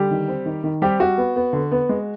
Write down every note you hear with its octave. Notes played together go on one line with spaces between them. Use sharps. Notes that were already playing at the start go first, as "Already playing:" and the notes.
Already playing: D3 G3 G4
D#3
C4
D#3
D#3
G3 C4 G4
G3 F#4
B3
B3
D3
B3
G#3